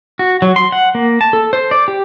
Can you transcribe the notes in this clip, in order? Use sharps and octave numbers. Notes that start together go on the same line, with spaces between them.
F#4
F#3
C6
F#5
A#3
A5
A4
C5
D5
G4